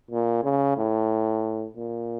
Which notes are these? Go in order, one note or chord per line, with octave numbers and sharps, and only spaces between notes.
A#2
C#3
A2
A#2